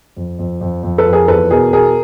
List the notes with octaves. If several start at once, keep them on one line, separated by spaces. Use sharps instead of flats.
F2
F2
F2
F2
A4 B4
F2
G#4 A#4
E2 A4 B4
B2 G#4 A#4
B2 G#4 A#4